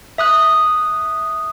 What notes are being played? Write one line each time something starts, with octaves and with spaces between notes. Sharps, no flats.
E5 D#6 F#6